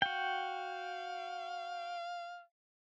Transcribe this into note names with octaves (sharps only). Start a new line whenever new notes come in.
F#4 F5 G5